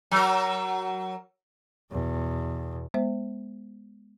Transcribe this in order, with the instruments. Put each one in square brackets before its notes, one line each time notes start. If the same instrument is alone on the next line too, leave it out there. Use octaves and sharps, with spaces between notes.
[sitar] F#3 A#4
[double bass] E2 B2
[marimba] G#3 B3 C5 E5